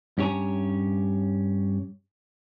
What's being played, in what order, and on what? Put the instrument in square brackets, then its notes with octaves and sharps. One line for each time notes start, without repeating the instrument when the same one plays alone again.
[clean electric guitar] G2 C#4 G4 C#5 G#5 A#5